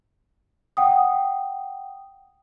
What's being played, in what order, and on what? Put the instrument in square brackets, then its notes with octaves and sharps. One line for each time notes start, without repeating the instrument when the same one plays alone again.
[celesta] F#5 G5 D#6